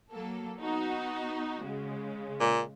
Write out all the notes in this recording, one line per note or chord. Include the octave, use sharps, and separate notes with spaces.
F#3 A#3 A4
B3 D#4 F#4
C#3 G#3
A#2